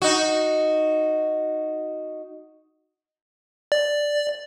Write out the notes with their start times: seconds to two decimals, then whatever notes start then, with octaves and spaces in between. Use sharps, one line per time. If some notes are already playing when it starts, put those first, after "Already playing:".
0.02 D#4 F#4
3.72 D5